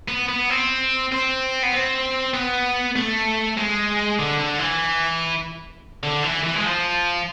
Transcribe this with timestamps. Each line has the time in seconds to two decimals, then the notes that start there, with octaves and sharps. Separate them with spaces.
0.08 B3
0.29 B3
0.50 C4
1.12 C4
1.63 B3
1.73 C4
2.34 B3
2.96 A3
3.57 G#3
4.19 D3
4.40 D3
4.59 E3
6.03 D3
6.24 E3
6.44 E3
6.56 G#3
6.66 F3